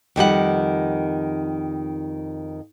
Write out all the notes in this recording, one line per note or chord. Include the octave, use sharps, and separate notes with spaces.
F2 D#3 G3 F#5